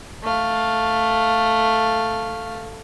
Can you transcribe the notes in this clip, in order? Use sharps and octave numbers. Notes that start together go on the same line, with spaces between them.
A3 F5